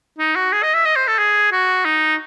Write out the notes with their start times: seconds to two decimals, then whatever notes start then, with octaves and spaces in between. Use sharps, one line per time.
0.18 D#4
0.35 F#4
0.52 G#4
0.63 D#5
0.74 E5
0.85 D#5
0.96 C5
1.07 A4
1.18 G#4
1.52 F#4
1.85 D#4